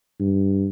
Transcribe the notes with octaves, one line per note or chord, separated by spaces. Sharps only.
G2